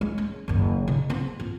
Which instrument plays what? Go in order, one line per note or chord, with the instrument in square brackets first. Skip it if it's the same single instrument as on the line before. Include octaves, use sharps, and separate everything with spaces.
[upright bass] G#3
C#4
F#1 D#2
C#3
B3 C4
F4